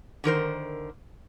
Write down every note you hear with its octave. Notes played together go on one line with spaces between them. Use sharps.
D3 D#3 A#4 C5